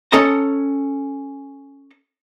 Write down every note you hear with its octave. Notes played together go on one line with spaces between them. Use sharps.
C#4 A4 D#5 A5 A#5